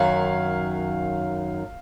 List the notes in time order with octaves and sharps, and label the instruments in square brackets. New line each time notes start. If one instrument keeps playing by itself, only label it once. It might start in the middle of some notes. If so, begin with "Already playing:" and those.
Already playing: [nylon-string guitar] F#2 D#3 F#3 [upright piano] F5